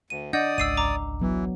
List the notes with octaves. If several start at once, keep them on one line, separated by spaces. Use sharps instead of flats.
D2 D#7
D4 D5 D#5 F#5 D#6 G6
G#1 C#2 E6 C7 D#7
A#5 D6
E3 F#3 B3